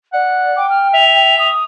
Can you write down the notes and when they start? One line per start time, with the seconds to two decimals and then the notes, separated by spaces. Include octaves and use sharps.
0.13 D5 F#5
0.56 G5 D6
0.70 F6
0.94 E5 F7
1.38 D#6